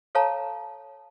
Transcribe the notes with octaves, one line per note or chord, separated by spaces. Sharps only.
A4 C#5 F5 A5 A#5